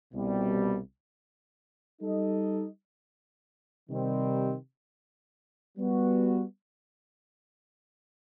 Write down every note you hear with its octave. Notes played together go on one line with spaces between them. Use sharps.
C2 B2 G3
G3 D#4 A4 D#5
C3 D#3 G3 C4
G3 B3 F#4